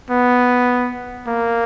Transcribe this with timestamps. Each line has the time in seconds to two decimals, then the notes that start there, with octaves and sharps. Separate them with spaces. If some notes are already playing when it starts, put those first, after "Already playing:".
0.10 B3
1.28 A#3